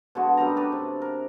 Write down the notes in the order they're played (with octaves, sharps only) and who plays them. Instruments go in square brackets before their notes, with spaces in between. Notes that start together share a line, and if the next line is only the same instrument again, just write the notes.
[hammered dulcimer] B2 D3 G#3 F#4
F#2 G3 D#4 A#5
A3 D4 B4
C3
A#4